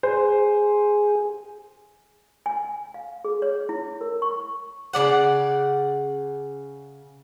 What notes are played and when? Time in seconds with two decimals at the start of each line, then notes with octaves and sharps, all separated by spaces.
0.03 G#4 C5
2.46 G#5
2.94 F5
3.25 G#4
3.42 C#5
3.69 E4
4.01 A#4
4.22 C#6
4.93 C#3 F#3 D5 F#5